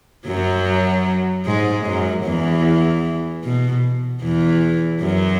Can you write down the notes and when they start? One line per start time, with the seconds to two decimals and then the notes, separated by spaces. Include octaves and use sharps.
0.26 F#2 F#3
1.45 G#2 G#3
1.85 F#2 F#3
2.25 E2 E3
3.44 B2
4.22 E2 E3
5.02 F#2 F#3